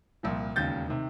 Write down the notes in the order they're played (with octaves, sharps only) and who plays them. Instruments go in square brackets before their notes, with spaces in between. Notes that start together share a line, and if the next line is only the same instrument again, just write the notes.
[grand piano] C2 A#2 F3
E1 D#2 C#3 G6 A6
C3 D#3